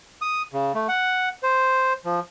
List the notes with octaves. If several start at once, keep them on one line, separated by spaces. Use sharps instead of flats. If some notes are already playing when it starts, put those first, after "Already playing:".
D#6
C#3
A3
F#5
C5
F3